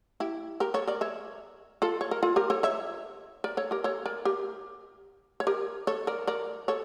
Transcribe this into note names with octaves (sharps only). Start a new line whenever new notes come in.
E4 G4
G4 A#4
A4 C#5
A#4 D5
C#5 E5
F4 A4
C#5
A#4
F4 A4
G4 A#4
A4 C#5
C#5 E5
A#4 D5
A4 C#5
G4 A#4
A4 C#5
A#4 D5
G4 A#4
C#5
G4 A#4
A4 C#5
A#4 D5
A#4 D5
A4 C#5